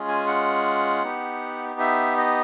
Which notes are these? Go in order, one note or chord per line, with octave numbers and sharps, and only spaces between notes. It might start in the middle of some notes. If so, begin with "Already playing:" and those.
Already playing: G#3 C#4 F4 G#4
G#5
F#5
B3 D#4 G4
E5
D#5